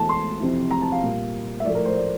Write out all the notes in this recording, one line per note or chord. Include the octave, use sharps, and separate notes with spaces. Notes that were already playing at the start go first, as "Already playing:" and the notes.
Already playing: E2 E3 A3 A5
C6
F2 C3 E3
A#5
A5
F5
A#2 G3
E5
A2 F3 A3 D5
A#4
C5
D5